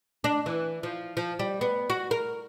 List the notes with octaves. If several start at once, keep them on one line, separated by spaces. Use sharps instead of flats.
D4
E3
F3
F3
G3
B3
F#4
A#4